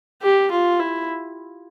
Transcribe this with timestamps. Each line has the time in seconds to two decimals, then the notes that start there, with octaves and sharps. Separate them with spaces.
0.23 G4
0.51 F4
0.79 E4